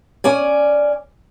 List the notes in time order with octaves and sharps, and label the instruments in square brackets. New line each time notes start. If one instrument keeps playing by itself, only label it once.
[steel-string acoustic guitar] C#4 D5 G#5